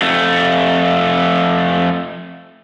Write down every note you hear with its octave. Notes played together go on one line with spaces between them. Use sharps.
F2 A3